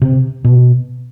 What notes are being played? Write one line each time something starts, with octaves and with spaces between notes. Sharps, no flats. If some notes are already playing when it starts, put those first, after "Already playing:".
C3
B2